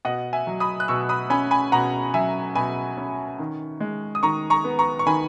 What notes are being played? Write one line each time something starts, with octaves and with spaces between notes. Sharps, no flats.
B2 D#5 F#5
E5 G#5
F#3
B5 D#6
F#6
B2 C#6 E6
B5 D#6
C#4 G#5 B5
G#5 B5
B2 F#5 A#5
F#3 E5 G#5
B2 G#5 B5
C#4
D#3
G#3
D#6
D#3 A#5 C#6
A#5 C#6
B3
A#5 C#6
C#6
D#3 G#5 B5